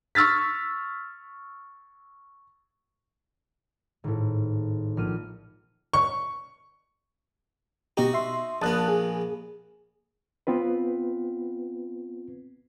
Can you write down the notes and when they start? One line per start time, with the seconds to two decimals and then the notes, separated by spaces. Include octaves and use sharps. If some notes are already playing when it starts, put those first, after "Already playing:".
0.15 C#6 E6 F6 A6 B6
4.04 G#1 A2
4.97 A#1 F6 D#7
5.93 C#6
7.97 B2 D#4 F#4 G4
8.14 E5 C6
8.62 A#1 A#2 B3 A5 D#6 F#6
8.88 G#4
10.47 B3 C4 F4 B4